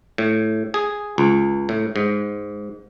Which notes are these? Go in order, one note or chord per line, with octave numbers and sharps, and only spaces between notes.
A2
G#4
C#2
A2
G#2